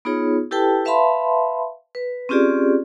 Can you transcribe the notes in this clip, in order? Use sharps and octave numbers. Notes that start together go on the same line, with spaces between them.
B3 D#4 F4 G#4 C#5
E4 G4 A4 B4 G5 A5
B4 E5 F5 A5 B5 C6
B4
C4 C#4 F4 G4 G#4 D5